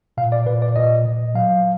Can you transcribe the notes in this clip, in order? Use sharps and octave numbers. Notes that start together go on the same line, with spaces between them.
A#2 F5
D5
A#2 B4
D5
A#2 D#5
A#2
F#3 F5